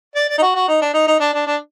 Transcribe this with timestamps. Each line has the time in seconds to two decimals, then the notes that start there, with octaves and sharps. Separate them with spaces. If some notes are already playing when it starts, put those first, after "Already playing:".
0.15 D5
0.29 D5
0.38 D#4
0.42 F#4
0.55 F#4
0.68 D#4
0.82 D4
0.94 D#4
1.07 D#4
1.20 D4
1.34 D4
1.47 D4